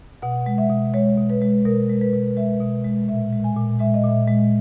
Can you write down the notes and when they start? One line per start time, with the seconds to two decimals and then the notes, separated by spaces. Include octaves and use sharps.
0.22 B2 F#5
0.46 G#3
0.58 E5
0.70 B2
0.94 G#3 C#5
1.18 B2
1.30 B4
1.42 G#3
1.65 B2 A#4
1.89 G#3
2.01 B4
2.13 B2
2.37 G#3 E5
2.60 B2
2.84 G#3
3.08 A#2 E5
3.33 G#3
3.44 G#5
3.56 A#2
3.79 G#3 E5
3.94 D#5
4.04 A#2 E5
4.28 G#3